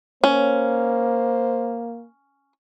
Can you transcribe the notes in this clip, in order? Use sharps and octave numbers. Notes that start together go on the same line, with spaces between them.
A#3 C#4 C5